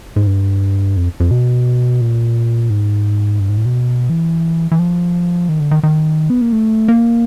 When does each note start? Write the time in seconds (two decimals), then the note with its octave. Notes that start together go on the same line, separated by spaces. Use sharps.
0.16 G#2
0.27 G2
0.97 F2
1.20 F2
1.31 B2
2.01 A#2
2.70 G#2
3.40 G2
3.49 G#2
3.57 A2
3.65 B2
4.10 E3
4.71 E3
4.79 F3
5.49 D#3
5.60 D3
5.71 D#3
5.83 D#3
6.30 B3
6.42 A#3
6.52 A3
6.88 A#3